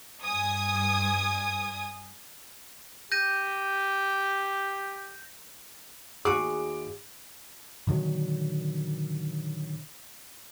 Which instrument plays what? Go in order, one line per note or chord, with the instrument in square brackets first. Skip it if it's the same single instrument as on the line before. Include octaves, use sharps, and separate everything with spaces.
[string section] G2 G#5 D#6 G#6
[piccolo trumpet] G4 [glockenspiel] G6 A#6 D#7
[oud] D#2 F#4 G#4 [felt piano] D6
[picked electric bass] A#2 D3 D#3 F#3